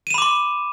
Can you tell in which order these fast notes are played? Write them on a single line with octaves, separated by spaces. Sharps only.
D#7 E7 B5 D6 C6